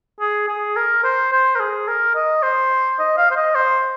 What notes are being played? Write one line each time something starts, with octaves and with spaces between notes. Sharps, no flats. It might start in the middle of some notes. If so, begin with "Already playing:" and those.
G#4
G#4
A#4
C5
C5
A#4
G#4
A#4
D#5
C5
D#5
F5
C5
D#5
C5